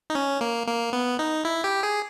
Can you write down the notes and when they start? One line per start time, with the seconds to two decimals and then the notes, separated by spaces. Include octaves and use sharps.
0.10 D#4
0.15 C#4
0.41 A#3
0.67 A#3
0.93 B3
1.19 D#4
1.45 E4
1.64 G4
1.83 G#4